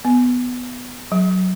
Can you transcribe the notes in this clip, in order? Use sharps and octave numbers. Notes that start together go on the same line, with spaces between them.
B3
F#3